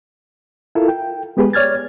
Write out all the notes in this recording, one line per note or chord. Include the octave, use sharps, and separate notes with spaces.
E4 F4 A4 A#4
G5
G#3 B3 G4 G#4 B4
C#5 D5 F6 G#6 A6